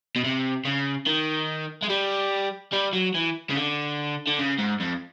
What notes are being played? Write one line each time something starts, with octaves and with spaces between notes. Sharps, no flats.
B2
C3
C#3
D#3
G#3
G3
G3
F#3
E3
C#3
D3
D3
C#3
G#2
F2